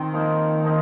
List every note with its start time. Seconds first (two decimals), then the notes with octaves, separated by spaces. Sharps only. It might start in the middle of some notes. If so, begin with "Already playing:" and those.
Already playing: D#3 C4
0.13 F3 A#3 D#4
0.63 F3 A#3 D#4